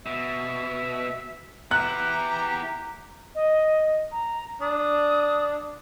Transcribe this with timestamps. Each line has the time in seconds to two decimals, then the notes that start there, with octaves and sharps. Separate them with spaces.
0.06 B2 E5
1.71 B3 E4 G4 A#5 F#6
3.35 D#5
4.12 A#5
4.61 D4 D#6